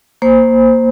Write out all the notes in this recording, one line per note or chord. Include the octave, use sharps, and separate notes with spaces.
A#3 C5